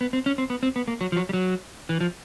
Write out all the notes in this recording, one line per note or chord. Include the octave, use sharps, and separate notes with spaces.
B3
C4
C#4
C4
B3
C4
B3
A#3
F#3
F3
F#3
G3
F#3
E3
F3